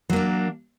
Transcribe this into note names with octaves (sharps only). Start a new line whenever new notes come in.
F#3 A#3 D4